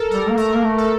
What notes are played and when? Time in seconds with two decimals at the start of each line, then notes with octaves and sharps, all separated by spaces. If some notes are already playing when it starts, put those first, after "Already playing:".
Already playing: A4 A#4
0.11 G3 A#4
0.29 A#3
0.37 A3 A#4
0.54 A#3
0.64 A3
0.78 A4